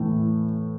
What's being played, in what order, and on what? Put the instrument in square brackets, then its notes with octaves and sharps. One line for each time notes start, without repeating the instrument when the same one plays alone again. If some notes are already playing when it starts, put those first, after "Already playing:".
Already playing: [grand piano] A2 E3 A3